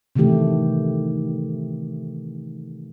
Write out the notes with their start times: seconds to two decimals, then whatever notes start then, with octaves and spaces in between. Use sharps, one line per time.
0.16 C3 D#3 E3 A3 G4